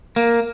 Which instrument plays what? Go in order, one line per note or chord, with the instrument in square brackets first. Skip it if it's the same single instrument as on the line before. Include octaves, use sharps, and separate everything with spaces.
[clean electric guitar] A#3